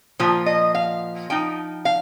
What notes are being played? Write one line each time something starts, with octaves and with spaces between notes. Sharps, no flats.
A#2 F3
D#5
F5
F3 D#4 G5
F5